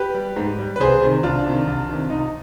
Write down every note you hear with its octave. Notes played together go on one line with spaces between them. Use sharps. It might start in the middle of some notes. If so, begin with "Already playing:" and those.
Already playing: G4 B4
G3
G#2
G3
B4
C2 G#4 C5
C3 D#3
C2 D4 F4
C3 D#3
C2
C3 D#3
C2 D#4